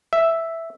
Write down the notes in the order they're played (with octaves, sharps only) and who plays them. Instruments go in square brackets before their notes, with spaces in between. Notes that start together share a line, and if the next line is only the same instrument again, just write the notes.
[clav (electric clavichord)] E5